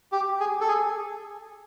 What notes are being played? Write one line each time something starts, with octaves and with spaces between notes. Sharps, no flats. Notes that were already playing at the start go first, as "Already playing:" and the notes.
G4
G#4
A4
G#4